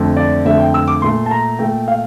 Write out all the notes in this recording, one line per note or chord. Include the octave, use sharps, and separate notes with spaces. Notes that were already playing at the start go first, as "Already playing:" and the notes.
Already playing: F2 D3 A3
D5
F2 D3 A3 E5
G5
E6
D6
A#2 A3 C6
A5
A#5
A#2 A3 G5
F5